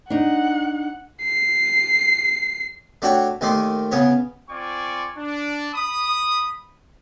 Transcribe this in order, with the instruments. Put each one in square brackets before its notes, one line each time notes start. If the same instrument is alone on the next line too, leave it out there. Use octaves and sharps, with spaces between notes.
[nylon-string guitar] D4 D#4 [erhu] F#5
[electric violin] C7
[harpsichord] A3 D4 F#4 C#5 F#5 G5
D#2 D#3 A3 D5 C6
C#3 B3 C#5
[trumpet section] C4 F4 D5 G#5 C#6
D4
B5 D#6